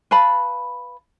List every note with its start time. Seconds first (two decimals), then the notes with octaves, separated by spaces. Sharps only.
0.11 B4 F5 A5 B5